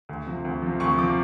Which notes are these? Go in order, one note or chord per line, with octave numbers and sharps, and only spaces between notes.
D2
C3 F3
D2
C3 F3
D2 C#6
C3 F3 D6